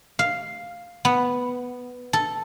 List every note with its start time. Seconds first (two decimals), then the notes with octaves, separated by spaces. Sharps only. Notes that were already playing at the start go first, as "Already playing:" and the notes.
0.19 F5
1.05 B3
2.13 A4